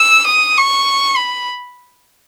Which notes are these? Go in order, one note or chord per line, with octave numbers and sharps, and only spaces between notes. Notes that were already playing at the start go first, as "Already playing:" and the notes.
Already playing: E6
D#6
C#6
B5